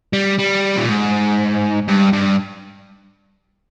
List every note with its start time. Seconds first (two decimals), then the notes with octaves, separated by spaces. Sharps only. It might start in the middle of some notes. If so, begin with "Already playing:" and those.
0.13 G3
0.38 G3
0.77 A#2
0.88 G#2
1.88 G2
2.13 G2